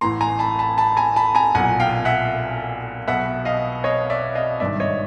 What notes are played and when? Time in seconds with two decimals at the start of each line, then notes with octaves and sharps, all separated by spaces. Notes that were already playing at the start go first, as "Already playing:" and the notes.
0.01 A1 A2 E3 A#5 C6
0.21 G#5 A#5
0.39 A5 B5
0.59 A5 B5
0.78 A5 B5
0.97 G#5 A#5
1.16 A5 B5
1.35 G#5 A#5
1.55 B1 A#2 F#5 G#5
1.80 F5 G5
2.05 E5 F#5
3.08 B1 B2 E5 F#5
3.45 D#5 F5
3.84 C#5 D#5
4.10 D5 E5
4.35 D#5 F5
4.60 G#1 G2 D#3 D5 E5
4.80 C#5 D#5